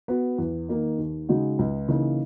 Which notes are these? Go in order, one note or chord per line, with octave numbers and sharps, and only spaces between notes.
B3 F#4
E2
D#3 A#3 D#4
D#2
C#3 G#3 D#4 F#4
C#2
C#3 E3 A#3 D#4